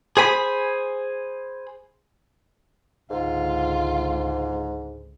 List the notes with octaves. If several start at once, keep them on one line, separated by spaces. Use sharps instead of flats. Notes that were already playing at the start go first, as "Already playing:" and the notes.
G#4 C5 G#5 B5
C#2 G#2 D3 F4